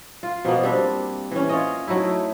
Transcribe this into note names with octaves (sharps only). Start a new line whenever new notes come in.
F4
B2 F3 A#3 B3
G3 C4 D4
E3 C#4
F4 C#5 D#5
F#3 A3 D#4 E4